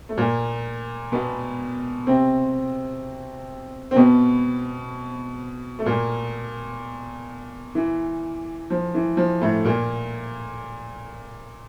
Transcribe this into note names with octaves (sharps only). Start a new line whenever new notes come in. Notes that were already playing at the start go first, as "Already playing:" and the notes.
A3
A#2 A#3
B2 B3
C3 C4
C4
B2 B3
A3
A#2 A#3
E3
F3
E3
F3
A2 A3
A#2 A#3